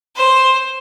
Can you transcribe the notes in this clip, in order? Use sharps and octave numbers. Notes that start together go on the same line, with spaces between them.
C5